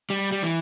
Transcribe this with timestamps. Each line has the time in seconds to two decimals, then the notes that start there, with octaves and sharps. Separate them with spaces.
0.10 G3
0.32 G3
0.43 E3